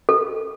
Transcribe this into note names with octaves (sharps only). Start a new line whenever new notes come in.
A4